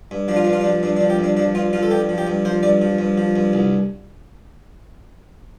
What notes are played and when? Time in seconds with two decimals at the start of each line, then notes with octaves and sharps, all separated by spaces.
0.11 G2
0.28 F3 D4
0.36 F4
0.44 G2 D4
0.53 F4
0.61 D4
0.64 F3
0.83 G2 D4
0.96 D4
1.01 F3
1.10 G4
1.19 G2
1.24 D4
1.37 F3 D4
1.55 G2 F4
1.73 F3 F4
1.83 A4
1.91 G2 G4
2.09 F3
2.18 G4
2.27 G2
2.45 F3 C5
2.63 G2 D5
2.81 F3
2.99 G2
3.18 F3
3.36 G2
3.53 C2